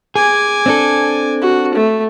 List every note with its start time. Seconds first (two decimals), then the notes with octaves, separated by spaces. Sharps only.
0.16 G#4 G#5 D6
0.66 C4 D4 A4
1.42 F#4
1.74 A3